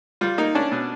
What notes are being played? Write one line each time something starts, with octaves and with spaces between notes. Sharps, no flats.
G3 F4
A#3 D#4
C#4 D4
B2